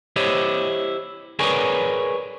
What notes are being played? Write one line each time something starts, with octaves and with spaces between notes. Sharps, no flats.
E4 G4 C5 C#5 D#5
G#4 A#4 B4 C#5 D5 G#5